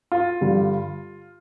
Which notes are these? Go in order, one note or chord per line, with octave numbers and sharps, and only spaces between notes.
F4
G2 D3 G3